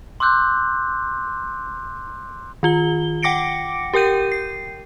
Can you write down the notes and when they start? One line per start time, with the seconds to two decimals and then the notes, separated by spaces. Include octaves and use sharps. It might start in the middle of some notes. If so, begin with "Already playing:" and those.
0.20 C6 D6 E6 F#6 G6
2.63 D#3 F4 G7
3.23 F#5 G5 D6 A#6 C#7 D7
3.94 G4 A#4 G5 G6 D#7
4.32 C7